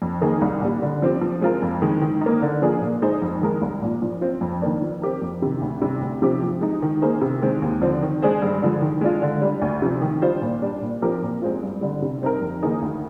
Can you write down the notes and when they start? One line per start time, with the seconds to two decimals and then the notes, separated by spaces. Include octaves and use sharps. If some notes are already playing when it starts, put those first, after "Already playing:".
0.02 F2
0.21 D#3 A#3 D#4 G#4
0.41 C2
0.62 A#2 G3
0.82 D3
1.02 F3 C4 G4
1.21 F3
1.41 G#3 C4 F4 A#4
1.62 F2
1.82 D#3 G#3
2.01 D#3
2.21 A#3 D#4
2.42 D3
2.62 F3 A#3 D4 G#4
2.81 A#2
3.02 G#3 D#4 G#4 C5
3.22 F2
3.41 D#3 G#3 D#4 A#4
3.62 C2
3.82 A#2 F3
4.02 F3
4.21 C4 F4
4.41 F2
4.62 D#3 A#3 D4
4.82 F3
5.02 C4 G4 A#4
5.22 F2
5.42 C3 D#3
5.61 D2
5.82 C3 G3
6.01 D2
6.22 C3 F3 C4 G4
6.42 F3
6.61 G#3 D#4
6.82 D#3
7.02 A#3 D#4 G#4 C5
7.21 C3
7.42 D#3 G#3 C4
7.62 D#2
7.82 D3 F3 C4
8.02 D#3
8.22 G#3 D4 G#4 C5
8.42 G2
8.62 D3 F3 G#3
8.81 D#3
9.01 G#3 D4 F4
9.22 D3
9.42 G3 D4
9.62 D2
9.82 C3 F3
10.02 D#3
10.22 G3 D4 F4 C5
10.41 A#2
10.62 G3 D4
10.81 A#2
11.02 F3 C4 G4 A#4
11.22 A#2
11.42 G#3 C4 F4
11.62 G2
11.81 D3 G3
12.02 C3
12.22 G3 C4 D#4 A#4
12.41 F2
12.62 D#3 A#3 D#4 G#4
12.82 D2